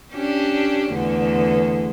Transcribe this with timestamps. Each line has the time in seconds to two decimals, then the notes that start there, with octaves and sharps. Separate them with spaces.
0.13 C#4 D4 G4
0.92 E2 D3 A3